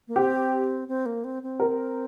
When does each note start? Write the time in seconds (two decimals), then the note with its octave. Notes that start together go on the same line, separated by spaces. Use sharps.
0.08 A#3
0.16 C4 G4
0.88 C4
1.06 A#3
1.24 C4
1.43 C4
1.60 A#4